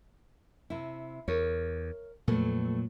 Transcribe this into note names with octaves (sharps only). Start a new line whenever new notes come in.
C3 E4
E2 A#4 C#5
F2 A#2 F#3 A3 B4